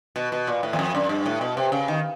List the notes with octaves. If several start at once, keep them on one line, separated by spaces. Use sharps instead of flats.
B2
B2
A#2
A2
E2
F2
F#2
G2
A2
B2
C3
C#3
D#3